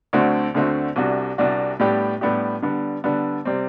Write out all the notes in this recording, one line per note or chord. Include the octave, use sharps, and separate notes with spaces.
D2 D3 A3 C4 F#4
D2 D3 A3 C4 F#4
C2 C3 G3 D4 F#4
C2 C3 G3 D4 F#4
A2 G3 B3 D4 G4
A2 G3 B3 D4 G4
D3 G3 B3
D3 G3 B3
C3 G3 C4